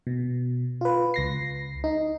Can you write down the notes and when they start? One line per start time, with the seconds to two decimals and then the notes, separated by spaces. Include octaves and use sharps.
0.07 B2
0.81 F4 B4
1.14 C#2 A#6 C7
1.84 D#4